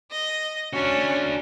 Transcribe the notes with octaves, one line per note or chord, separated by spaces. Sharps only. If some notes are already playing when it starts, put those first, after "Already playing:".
D#5
C#4 D4 F#4